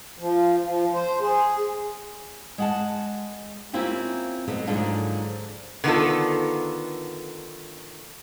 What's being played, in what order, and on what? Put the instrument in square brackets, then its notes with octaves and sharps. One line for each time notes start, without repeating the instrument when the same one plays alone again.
[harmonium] F3
F3
C5
G#4
[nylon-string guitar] G#3 F#5 A5
A#3 C4 C#4 E4 F4 G4
B2 F#3 A3 B3
G#2 D3 F3 F#3 A#3 D4
[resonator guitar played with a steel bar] D3 D#3 B3 D#4 F4 A4